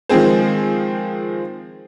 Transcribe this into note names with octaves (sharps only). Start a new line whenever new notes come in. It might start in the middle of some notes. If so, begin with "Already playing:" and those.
D#3 F3 G#3 C4 G#4 C5